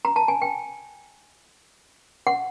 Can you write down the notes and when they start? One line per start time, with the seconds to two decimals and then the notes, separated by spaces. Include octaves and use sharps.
0.05 A#5
0.16 A5
0.28 G#5
0.42 G5
2.27 F#5